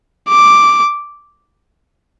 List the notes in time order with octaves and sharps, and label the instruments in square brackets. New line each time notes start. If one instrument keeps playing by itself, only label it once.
[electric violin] D6